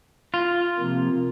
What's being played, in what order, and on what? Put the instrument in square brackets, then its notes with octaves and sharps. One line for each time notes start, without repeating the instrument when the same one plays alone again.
[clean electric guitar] F4
[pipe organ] C3 F3 A#3